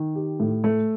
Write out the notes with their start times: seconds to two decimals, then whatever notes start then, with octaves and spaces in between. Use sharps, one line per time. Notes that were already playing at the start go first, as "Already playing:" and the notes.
Already playing: D#3
0.16 G4
0.40 A2
0.64 A3